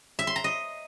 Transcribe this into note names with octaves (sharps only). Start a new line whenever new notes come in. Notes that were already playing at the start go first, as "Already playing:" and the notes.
E5
C6
A#5
D#5